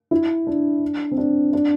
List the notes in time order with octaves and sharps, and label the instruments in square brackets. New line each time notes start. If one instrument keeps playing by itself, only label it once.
[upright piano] E4
D4
C4
D4
D4